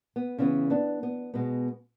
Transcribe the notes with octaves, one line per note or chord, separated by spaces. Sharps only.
B3
C#3 E3 B3 C#4
B3 D4
B3
B2 G#3 B3